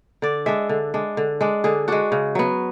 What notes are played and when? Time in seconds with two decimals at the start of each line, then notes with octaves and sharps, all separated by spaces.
0.22 D3 D5
0.46 G#3 D4 E5
0.69 D3
0.94 G#3 D4
1.17 D3
1.41 G#3 D4
1.64 D3 G#4
1.88 G#3 D4 F#4
2.12 C#3
2.35 F#3 B3